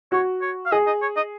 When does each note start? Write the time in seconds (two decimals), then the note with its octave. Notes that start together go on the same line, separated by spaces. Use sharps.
0.12 F#4 C#5
0.42 C#5
0.66 F5
0.72 G#4 D#5
0.87 D#5
1.02 C#5
1.16 D#5